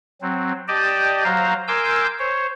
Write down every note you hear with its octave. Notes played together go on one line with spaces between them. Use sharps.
F#3 C4
G4 D5 D#5 G5 A5
F#3 C5 F5 A#5
A#4 G#5 C6 D6 E6 G6
C5 C#5